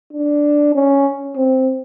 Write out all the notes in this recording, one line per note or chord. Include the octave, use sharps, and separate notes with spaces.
D4
C#4
C4